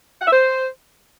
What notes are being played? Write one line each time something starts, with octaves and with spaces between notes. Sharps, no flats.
F#5
E5
C5